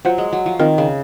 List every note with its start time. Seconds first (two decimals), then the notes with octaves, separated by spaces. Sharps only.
0.05 F#3 F4 C5 F#5
0.18 G#3
0.33 F#3
0.46 F3
0.59 D#3 C4 F4 A#4
0.78 C#3